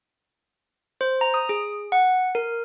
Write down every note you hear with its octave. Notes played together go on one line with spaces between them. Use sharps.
C5
A#5
D#6
G#4
F#5
A#4